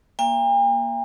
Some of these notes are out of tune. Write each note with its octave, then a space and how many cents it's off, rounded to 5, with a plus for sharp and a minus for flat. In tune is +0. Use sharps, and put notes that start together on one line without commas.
A#3 +15 E5 +45 G5 +45